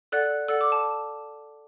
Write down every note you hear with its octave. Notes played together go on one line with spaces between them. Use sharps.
A4 D5 F#5 F#6
A4 D5 F#5 E6
D6
A5